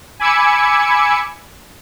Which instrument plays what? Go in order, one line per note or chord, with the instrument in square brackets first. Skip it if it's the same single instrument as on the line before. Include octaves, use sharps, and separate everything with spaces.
[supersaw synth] G#5 B5 D6 E6 G#6 C#7